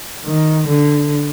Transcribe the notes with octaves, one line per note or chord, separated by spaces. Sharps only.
D#3
D3